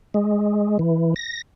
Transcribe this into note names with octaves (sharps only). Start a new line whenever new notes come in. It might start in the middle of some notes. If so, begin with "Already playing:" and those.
G#3
E3
A#6